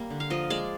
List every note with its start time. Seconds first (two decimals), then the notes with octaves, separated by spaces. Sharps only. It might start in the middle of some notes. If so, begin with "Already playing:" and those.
Already playing: G3 A#3
0.10 D3
0.20 F5
0.30 F3 D#5
0.50 G#3 D5